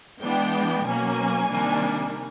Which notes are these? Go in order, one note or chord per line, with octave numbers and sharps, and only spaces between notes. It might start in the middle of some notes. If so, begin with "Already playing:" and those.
E3 G#3 B3 D4 G5
B2 F#3 A#3 C#4 G#5
C3 D#3 G3 A#3 D4